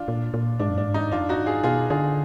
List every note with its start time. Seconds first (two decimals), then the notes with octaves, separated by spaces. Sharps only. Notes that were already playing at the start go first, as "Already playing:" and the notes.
Already playing: D4 F4
0.08 A#2
0.34 A#2
0.59 G#2 D4
0.69 F#2
0.78 G#2 D4
0.94 D#4
1.11 F2 D4 F4
1.29 D#4 F#4
1.38 G#2
1.46 F4 G#4
1.64 B2 F4 G#4
1.90 D3 F4 G#4